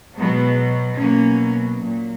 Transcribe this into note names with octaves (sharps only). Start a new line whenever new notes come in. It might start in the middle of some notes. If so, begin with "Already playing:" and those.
B2 F#3 G#3 B3
B2 F#3 A#3 C#4
A#2 F#3